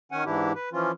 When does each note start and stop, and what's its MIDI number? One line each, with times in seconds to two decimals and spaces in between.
0.12 0.24 51
0.12 0.24 61
0.12 0.24 78
0.12 0.24 80
0.25 0.52 44
0.25 0.52 52
0.25 0.52 62
0.25 0.52 64
0.25 0.52 67
0.55 0.69 71
0.73 0.92 52
0.73 0.92 53
0.73 0.92 61
0.73 0.92 65